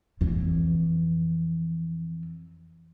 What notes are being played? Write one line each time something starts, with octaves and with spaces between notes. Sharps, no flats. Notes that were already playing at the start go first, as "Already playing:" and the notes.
F2 E3